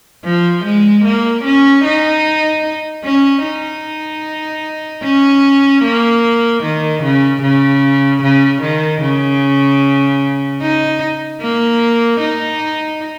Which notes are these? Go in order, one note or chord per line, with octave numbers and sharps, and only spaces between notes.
F3
G#3
A#3
C#4
D#4
C#4
D#4
C#4
A#3
D#3
C#3
C#3
C#3
D#3
C#3
D#4
A#3
D#4